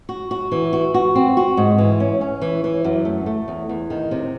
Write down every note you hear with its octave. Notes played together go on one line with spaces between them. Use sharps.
F#4
F#4
E3
F#4
F#4
C4
F#4
G#2
E3
C#4
C#4
E3
E3
F#2
A3
A3
E2
E2
D#3
C3